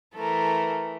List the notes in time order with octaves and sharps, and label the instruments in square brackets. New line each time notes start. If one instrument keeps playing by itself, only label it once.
[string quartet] E3 A3 [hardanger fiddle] A4 A#4